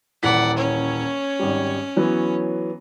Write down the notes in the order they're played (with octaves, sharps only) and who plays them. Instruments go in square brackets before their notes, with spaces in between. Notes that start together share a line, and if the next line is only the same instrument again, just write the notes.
[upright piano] D#1 E3 B6 [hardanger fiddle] D5 F#5
[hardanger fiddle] C#4 C#5
[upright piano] G#1 G3
E3 F#3 B3